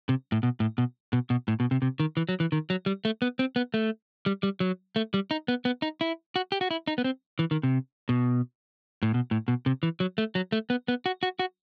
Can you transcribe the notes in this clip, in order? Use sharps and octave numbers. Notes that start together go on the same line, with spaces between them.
C3
A2
B2
A2
B2
B2
B2
A2
B2
C3
C3
D#3
E3
F#3
E3
D#3
F#3
G3
A3
B3
C4
B3
A3
G3
G3
F#3
A3
G3
D#4
B3
B3
D#4
E4
F#4
G4
F#4
E4
D#4
B3
C4
E3
D#3
C3
B2
A2
B2
A2
B2
C3
E3
F#3
A3
F#3
A3
B3
B3
F#4
F#4
F#4